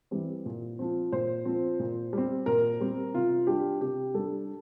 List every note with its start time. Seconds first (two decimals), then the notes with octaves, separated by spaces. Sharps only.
0.11 E3 G3 C4
0.46 A#2
0.79 F3 C4
1.12 A#2 C5
1.45 F3 C4
1.79 A#2
2.13 G3 C4
2.46 A#2 A#4
2.80 G3 C4
3.14 C3 F4
3.47 G3 D4 G4
3.81 C3 G4
4.14 G3 D4 A4